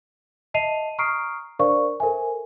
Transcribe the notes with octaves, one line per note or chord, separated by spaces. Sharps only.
D#5 E5 A5 C7 D#7 F7
A#5 C#6 D#6 F6 C7 D7
D4 A#4 C5 D5 F5 C#6
A4 A#4 C5 E5 G#5